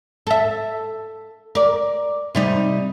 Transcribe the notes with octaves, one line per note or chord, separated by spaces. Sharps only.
A4 E5
A#4 D5
C3 G3 D#4